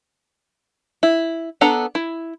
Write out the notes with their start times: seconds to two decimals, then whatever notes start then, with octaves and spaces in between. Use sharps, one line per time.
1.03 E4
1.61 B3 D4 A4 F#5 A#5
1.95 E4